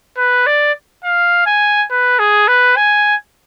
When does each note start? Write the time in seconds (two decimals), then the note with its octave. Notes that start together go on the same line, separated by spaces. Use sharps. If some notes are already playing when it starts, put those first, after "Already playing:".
0.18 B4
0.47 D5
1.04 F5
1.47 G#5
1.91 B4
2.19 G#4
2.48 B4
2.77 G#5